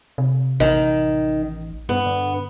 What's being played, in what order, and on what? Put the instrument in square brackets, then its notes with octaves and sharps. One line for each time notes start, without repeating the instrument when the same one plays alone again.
[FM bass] C3
[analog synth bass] A1 [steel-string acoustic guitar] D#3
[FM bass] G2 [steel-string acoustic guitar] B3
[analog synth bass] D3